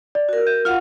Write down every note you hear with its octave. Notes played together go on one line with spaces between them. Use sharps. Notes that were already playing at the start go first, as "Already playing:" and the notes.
D5
F#4 A#4
G6
F4 F5 F#5 F6